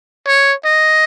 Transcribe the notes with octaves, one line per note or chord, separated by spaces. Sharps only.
C#5
D#5